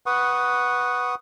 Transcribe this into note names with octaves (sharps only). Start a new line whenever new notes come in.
B4 F#5 C#6 D#6